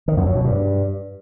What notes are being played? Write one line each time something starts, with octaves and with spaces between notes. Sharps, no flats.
D#3
F#2
F#3
B2
G2